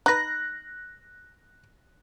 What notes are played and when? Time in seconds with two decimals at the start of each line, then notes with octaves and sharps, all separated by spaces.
0.06 D#4 B4 F#6 A#6